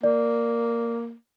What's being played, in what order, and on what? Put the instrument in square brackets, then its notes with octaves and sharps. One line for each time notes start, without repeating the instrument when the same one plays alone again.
[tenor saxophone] A#3 [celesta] D5